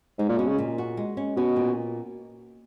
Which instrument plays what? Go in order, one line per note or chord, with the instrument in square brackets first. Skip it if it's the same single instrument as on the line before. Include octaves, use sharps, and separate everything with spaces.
[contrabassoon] G#2 [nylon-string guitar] G#3
[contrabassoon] A#2
[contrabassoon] B2 [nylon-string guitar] C#4
[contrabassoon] C#3
[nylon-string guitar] A#2
F#4
G#3
C#4
[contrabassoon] B2 [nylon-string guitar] C#4
[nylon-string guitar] A#2